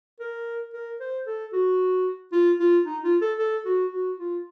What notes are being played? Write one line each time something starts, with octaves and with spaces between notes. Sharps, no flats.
A#4
A#4
C5
A4
F#4
F4
F4
D#4
F4
A4
A4
F#4
F#4
F4